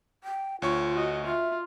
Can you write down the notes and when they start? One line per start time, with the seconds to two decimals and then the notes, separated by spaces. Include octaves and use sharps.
0.24 G5
0.62 D2 F4 C#5 C#6
0.93 F#4 D#5
1.25 F4 E5